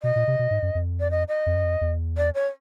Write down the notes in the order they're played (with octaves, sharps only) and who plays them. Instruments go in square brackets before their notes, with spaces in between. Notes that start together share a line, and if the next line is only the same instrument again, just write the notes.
[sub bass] B2 [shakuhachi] D#5
[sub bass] A#2
C3
B2
G#2
F#2
F2
[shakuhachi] D5
D#5
D#5
[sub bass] F2
F#2
F2
E2
[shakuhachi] D5
C#5